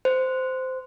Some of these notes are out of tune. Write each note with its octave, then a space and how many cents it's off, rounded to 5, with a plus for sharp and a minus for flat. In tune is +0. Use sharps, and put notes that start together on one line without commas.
C5 -15